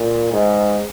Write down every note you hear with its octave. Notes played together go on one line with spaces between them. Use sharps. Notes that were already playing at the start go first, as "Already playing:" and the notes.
Already playing: A#2
G#2